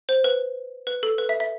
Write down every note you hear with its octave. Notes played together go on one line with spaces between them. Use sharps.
C5
B4
B4
A4
B4
E5
E5